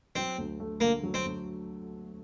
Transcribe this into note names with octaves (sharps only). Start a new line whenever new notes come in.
F#3 C4
D2
A3
D3 A#3
F#3
C4
D2